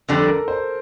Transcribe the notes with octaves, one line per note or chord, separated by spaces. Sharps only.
F2 D3 G3 A4
A#4
C5